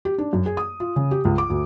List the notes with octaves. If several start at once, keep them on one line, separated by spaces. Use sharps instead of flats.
G4
D4
F#2
G#4
D#6
F4
C#3
G4
C#2
D6
D2